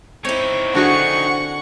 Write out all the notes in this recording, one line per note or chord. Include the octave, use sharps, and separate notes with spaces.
C4 D#4 E4 C#5
D3 F#4 G#4 F#5 C#6